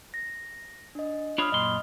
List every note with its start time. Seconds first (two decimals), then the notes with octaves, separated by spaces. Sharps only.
0.14 A#6
0.95 D4 D#5
1.38 D4 F4 C#5 B5 D#6 F6
1.52 F#2 A#2 D#5 C6